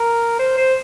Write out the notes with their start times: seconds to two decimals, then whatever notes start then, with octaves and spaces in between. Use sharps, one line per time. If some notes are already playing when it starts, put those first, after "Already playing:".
Already playing: A#4
0.39 C5
0.57 C5